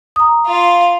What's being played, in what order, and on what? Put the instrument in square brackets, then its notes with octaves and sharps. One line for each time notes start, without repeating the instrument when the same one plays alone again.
[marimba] A#5 D#6
[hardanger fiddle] F4 F5